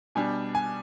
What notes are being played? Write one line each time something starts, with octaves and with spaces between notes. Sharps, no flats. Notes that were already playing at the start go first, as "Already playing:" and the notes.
B2 G3 D4 G#5
G#5